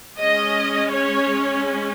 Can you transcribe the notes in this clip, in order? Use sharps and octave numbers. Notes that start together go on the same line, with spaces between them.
G#3 C#4 D#5
C#5